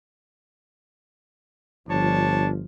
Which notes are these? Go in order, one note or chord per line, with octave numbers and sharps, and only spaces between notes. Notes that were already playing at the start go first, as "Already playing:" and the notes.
G1 F3 D4 C#5 A5